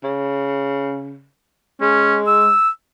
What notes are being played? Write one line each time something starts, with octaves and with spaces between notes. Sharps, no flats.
C#3
G#3 C#4
E6